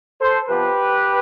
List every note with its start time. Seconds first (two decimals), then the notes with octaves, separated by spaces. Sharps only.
0.20 A4 C5
0.48 C3 F3 B3 G4 B4